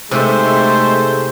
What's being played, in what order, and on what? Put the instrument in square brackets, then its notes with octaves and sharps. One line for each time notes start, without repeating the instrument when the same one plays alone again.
[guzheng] C3 [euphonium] G#3 [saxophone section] A3 [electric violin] D#4 C5